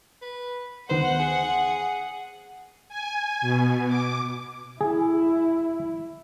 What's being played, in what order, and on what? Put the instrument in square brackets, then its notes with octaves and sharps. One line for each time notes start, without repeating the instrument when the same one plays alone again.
[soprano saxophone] B4
[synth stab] D2 D#3 B3 [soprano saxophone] C5 [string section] F#5
[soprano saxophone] G#4
[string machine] G#5
B2
D6
[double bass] E4 [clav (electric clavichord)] G#4